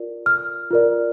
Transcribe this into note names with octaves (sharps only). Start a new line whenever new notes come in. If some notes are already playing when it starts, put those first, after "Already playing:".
Already playing: F4 A#4 D5
F6
F4 A#4 D5